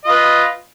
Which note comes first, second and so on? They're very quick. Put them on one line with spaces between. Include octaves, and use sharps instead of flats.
D#5 F4 B4